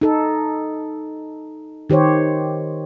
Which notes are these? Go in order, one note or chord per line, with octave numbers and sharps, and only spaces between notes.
D#4 A4
D#3 G4 C5 C#5